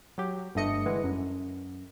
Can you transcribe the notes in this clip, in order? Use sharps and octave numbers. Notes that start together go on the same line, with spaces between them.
F#3 G4
G1 G2 A3 D#5 C#7
D3 E3 G#3
F#2